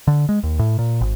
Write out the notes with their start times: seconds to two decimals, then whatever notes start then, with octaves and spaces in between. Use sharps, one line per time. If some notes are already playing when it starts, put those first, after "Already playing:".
0.07 D3
0.29 G#3
0.43 D#2
0.59 A2
0.79 A#2
1.01 G#1